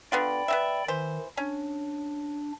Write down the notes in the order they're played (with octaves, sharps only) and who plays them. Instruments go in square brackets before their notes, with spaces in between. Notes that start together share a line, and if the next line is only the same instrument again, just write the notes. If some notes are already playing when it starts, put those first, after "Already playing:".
[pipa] D3 B3 F4 [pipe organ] D5 G5 B5
[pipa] B3 C4 E5
[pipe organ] D#3 [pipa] E3 C5
[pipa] C#4 [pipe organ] D4